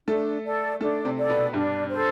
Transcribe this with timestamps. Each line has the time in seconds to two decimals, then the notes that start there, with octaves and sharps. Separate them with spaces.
0.07 A3 D4 A4
0.44 A4 D5
0.80 A3 D4 A4
1.05 C3 C4
1.17 A4 D5
1.29 B2 B3
1.53 G2 G3 D4
1.90 A4 C5